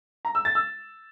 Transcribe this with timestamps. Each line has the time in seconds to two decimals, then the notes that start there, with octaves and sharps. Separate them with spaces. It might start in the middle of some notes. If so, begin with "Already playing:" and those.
0.25 A#5
0.35 E6
0.45 A6
0.55 E6